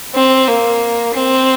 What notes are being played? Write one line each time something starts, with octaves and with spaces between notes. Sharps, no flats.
C4
A#3
C4